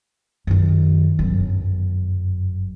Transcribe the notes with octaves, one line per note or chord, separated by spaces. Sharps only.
F#2 D#3
G1 F#2